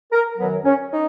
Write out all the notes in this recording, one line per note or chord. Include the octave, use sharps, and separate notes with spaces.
A#4
F#2 D#3 F#3 B3
C#4
D#4